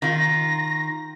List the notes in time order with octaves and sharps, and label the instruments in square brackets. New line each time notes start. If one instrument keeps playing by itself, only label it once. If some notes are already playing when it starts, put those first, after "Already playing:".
[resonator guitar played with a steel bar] D#3 F4 [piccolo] A#6